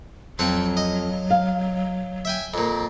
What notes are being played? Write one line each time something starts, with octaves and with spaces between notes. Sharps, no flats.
F2 F#3 C4 F#5
D#5
F5
E5 G5 G#5
F2 A#2